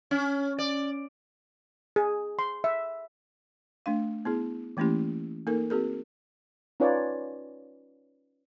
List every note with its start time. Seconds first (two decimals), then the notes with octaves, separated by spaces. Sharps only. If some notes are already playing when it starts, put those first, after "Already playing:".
0.11 C#4
0.59 D5
1.96 G#4
2.39 C6
2.64 E5
3.86 A3 D4 F5
4.25 B3 E4 G#4
4.77 E3 A3 A#3 C#4 E4 G4
5.47 A#3 D#4 A4 A#4
5.70 C4 F#4 G#4 A#4
6.80 C#4 D#4 F4 B4 C#5 D5